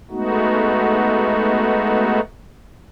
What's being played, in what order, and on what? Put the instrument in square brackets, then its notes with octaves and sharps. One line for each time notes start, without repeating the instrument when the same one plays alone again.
[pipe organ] G#3 A3 B3 D#4 F#4